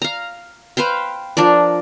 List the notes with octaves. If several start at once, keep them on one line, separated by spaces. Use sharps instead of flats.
F5 A#5
B4 C5 F5 G5
F3 D4 A#4 D5